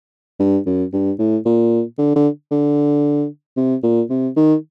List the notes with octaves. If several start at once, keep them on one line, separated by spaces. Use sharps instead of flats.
G2
F#2
G2
A2
A#2
D3
D3
D3
C3
A#2
C3
D#3